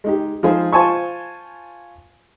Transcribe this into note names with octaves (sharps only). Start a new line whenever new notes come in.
G#3 D#4 G4
F3 G#3 D#4 F4 G#4 C5
F4 C5 G#5 A5 C#6